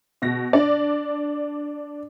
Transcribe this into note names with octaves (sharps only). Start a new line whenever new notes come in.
B2 A#6
D4 D5